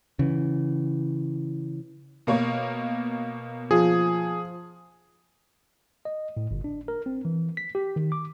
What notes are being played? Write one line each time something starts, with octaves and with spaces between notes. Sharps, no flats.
C#3 E3
B2 A#3 C#5
F3 G#4
D#5
A2
G1
D4
A#4
C4
E3
B6
G4
D#3
D6